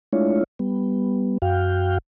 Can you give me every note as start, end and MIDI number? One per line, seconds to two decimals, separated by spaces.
0.13 0.44 56
0.13 0.44 57
0.13 0.44 62
0.13 0.44 64
0.13 0.44 65
0.13 0.44 73
0.59 1.38 55
0.59 1.38 59
1.42 1.98 42
1.42 1.98 66
1.42 1.98 77
1.42 1.98 79